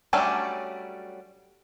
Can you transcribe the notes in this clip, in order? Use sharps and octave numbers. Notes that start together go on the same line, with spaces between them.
F#3 G3 A3 C#4 D4